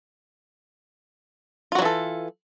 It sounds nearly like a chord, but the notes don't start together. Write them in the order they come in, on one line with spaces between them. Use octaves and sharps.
F4 F#4 F#3 E3 A4